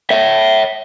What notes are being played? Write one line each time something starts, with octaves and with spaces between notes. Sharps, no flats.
C#5 E5